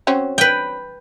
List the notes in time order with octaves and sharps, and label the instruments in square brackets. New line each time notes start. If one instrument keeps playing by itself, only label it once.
[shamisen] F#3 C4 C#4
[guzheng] B4 G5